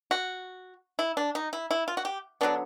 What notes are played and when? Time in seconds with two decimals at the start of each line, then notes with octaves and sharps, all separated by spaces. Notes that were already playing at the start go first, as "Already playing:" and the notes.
0.11 F#4
0.99 E4
1.17 D4
1.35 D#4
1.53 E4
1.71 E4
1.88 F4
1.97 F#4
2.05 G4
2.41 D3 F#3 B3 D4